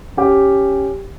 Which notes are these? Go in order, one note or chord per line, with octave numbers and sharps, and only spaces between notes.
C#4 G4